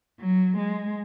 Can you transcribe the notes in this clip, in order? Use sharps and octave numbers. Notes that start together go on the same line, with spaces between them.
F#3
G#3